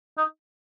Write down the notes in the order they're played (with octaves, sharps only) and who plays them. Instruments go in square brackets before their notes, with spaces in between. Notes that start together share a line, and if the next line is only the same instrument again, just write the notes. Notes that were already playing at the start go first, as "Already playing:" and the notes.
[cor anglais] D#4